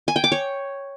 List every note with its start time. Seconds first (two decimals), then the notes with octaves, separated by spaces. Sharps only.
0.08 G#5
0.16 G5
0.24 D6
0.32 C#5